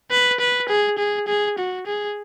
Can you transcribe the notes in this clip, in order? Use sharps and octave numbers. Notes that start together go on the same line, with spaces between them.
B4
B4
G#4
G#4
G#4
F#4
G#4